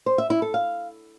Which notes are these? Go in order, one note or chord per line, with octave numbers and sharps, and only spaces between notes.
C5
E5
E4
A4
F5